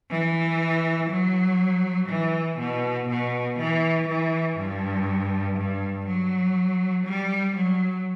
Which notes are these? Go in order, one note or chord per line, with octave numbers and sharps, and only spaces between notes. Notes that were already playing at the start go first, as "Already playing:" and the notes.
E3
F#3
E3
B2
B2
E3
E3
G2
G2
F#3
G3
F#3